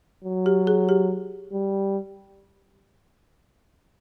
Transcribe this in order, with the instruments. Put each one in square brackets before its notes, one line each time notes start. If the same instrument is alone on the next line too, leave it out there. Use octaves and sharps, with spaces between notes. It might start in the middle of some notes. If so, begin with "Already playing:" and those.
[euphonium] F#3
[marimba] G4
G#4
G4
[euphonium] G3